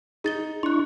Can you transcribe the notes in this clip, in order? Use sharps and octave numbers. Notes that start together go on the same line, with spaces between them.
D#4 G#4 A6 G7
D4 E4 C6 C#6 F#6